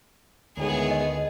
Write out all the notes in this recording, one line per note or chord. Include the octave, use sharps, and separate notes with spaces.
D2 A2 D#3 G#3 B3 G#4
D#5